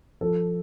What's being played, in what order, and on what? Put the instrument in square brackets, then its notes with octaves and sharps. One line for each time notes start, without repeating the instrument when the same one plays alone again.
[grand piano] F3 A4